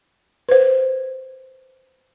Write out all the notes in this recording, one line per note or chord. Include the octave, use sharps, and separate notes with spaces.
B4 C5